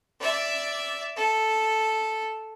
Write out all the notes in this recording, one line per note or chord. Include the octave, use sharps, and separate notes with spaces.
D5 E5
A4